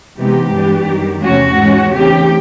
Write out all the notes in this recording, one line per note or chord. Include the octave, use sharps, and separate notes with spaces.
C3 E3 G#3 B3 D#4 G4
G2 E3 G#3 B3 D4
F#2 D#3 G3
E2 C3 F3 A3 C#4 F#4
G#2 E3 G#3 C#4
C#3 E3 A3 C4 D#4 G4